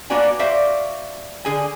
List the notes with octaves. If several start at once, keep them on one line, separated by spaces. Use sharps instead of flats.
A#3 B3 D4 F#4 D5 G#5
F#4 C5 D5 E5 F5
D3 G#4 G#5